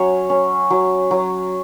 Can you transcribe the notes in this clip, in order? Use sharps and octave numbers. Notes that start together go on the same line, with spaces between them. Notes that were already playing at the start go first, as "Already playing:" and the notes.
Already playing: F#3 C#4 C#5
C#4
F#3
F#3